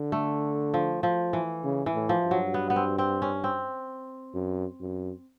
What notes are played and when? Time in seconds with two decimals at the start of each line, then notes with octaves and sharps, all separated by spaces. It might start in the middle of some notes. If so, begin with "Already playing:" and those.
Already playing: D3
0.12 A3
0.74 F3
1.03 F3
1.33 E3
1.64 C#3
1.86 E3
1.94 A2
2.09 F3
2.24 G2
2.31 F#3
2.54 B3
2.70 B3
2.76 C4
2.98 C4
3.22 C#4
3.44 C4
4.34 F#2
4.80 F#2